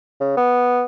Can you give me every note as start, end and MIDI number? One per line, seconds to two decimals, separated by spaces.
0.20 0.34 49
0.37 0.85 59